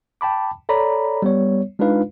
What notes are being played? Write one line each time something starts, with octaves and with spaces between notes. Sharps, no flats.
G5 A5 B5 D6
A4 C#5 D5 A#5 B5
G3 B3 C#5
G#3 D4 D#4 F4 B4 F5